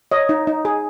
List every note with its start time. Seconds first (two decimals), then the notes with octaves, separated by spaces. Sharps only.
0.12 C#5 D#5
0.29 D#4
0.47 D#4
0.65 G#4